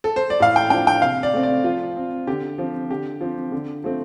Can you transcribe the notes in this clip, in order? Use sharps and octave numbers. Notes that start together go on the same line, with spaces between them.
A4
C5
D5
A2 F5
G5
F3 D4 G5
G5
C3 F5
D5
A3 C4
D5
F3 F4
C4
D3 G4
F3 C4
D3 G4
F3 C4
D3
F3 A3 C4